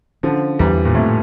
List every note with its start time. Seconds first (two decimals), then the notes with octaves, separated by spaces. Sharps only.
0.23 D3 F3 C#4
0.59 E2 E3 G3
0.85 A#2
0.95 F2 A2 A3